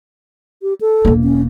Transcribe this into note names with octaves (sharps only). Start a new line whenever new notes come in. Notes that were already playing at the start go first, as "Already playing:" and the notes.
G4
A4
E1 A#3
C#4